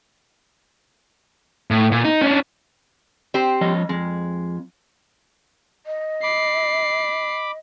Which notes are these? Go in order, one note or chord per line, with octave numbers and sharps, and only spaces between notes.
A2
A#2
D#4
C#4 D4
C4 G4 C5
F3 C#5 D#5
F2 G#3
D#5
B5 D6 C7